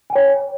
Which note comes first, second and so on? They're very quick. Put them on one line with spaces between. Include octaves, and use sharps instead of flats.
G#5 G5 C#5